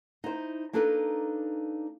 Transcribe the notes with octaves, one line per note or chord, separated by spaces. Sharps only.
D#4 E4 C5
A#3 D4 D#4 A4 B4